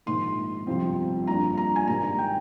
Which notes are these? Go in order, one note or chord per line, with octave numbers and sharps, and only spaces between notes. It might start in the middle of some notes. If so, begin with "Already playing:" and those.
A#1 G#2 D#3 C6
G1 F2 C3 F3 C4
G2 D3 F3 A#3 D4 A#5
A#5
G#5
G#2 D#3 G3 A#5
A#5
G5